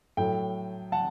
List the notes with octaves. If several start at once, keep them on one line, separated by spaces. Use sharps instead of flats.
A2 F#3 A3 G5
F#5 A5